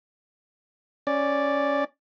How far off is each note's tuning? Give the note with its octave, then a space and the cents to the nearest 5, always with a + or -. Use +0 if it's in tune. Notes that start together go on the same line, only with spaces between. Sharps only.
C#4 +0 D5 +0